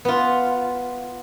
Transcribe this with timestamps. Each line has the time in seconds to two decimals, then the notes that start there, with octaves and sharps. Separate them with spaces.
0.05 B3 F4